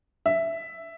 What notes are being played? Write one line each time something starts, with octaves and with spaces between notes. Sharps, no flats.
E5